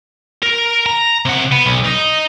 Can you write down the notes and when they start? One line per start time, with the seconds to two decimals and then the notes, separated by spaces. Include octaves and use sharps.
0.43 A#4
0.86 A#5
1.25 C3 F#5
1.52 B3
1.66 B1
1.85 D#4 D#5